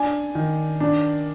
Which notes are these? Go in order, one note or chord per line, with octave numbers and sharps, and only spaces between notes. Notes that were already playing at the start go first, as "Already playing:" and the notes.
Already playing: D4 G#5
D#3
D4